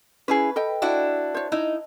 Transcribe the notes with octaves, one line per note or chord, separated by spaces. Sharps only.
C#4 E4 G#4 B4
A4 D#5 G5
D4 E4 F#4
C5 C#5
D#4 E4